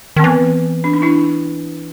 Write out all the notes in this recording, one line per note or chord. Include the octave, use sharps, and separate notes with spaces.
D#3
C4
E3 B3
D4
D#4
D4 E4